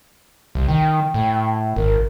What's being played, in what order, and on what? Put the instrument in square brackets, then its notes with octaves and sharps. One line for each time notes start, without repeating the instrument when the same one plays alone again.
[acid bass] C2
[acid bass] D#3 [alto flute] G5
[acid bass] A2
[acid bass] G#1 [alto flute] A#4